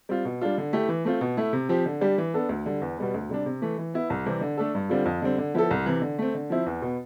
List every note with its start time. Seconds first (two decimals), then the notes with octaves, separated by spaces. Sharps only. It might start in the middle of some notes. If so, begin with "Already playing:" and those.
0.09 G3 C4 F4
0.25 B2
0.41 G3 D4 F4
0.58 D3
0.73 A3 E4 G4
0.89 E3
1.05 A3 C4 F4
1.21 B2
1.37 A3 E4
1.53 C3
1.69 F3 C4 G4
1.86 D3
2.01 G3 D4 G4
2.18 E3
2.34 B3 D4 A4
2.49 D2
2.66 D3 G3
2.82 E2
2.98 B2 G3 B3
3.14 D2
3.29 C3 G3 D4
3.46 C3
3.62 E3 A3
3.78 E3
3.94 B3 E4
4.10 C2
4.26 C3 E3 G3 C4
4.41 D3
4.57 A3 D4 A4
4.74 G2
4.89 D3 G3 C4 F4
5.05 F2
5.22 D3 G3 C4
5.38 D3
5.54 F3 B3 E4 A4
5.71 C2
5.86 C3 E3
6.02 D3
6.19 A3 C4
6.35 D3
6.50 F3 C4 E4
6.66 E2
6.82 B2 B3